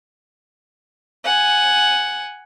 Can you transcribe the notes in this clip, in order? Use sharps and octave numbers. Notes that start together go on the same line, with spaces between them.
F#5 G#5